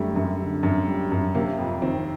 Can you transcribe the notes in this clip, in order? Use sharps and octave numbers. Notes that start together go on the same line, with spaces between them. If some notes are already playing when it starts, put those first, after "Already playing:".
Already playing: F#2 D3 G3 A3
F#2
D3
F#2
G3
F#2
C3 A#3
F2
D#3 C4